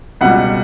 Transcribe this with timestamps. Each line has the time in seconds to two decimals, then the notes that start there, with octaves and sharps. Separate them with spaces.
0.21 C#2 B2 G3 F#5